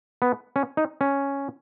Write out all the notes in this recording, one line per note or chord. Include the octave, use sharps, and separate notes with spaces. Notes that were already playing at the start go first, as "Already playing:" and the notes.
B3
C#4
D#4
C#4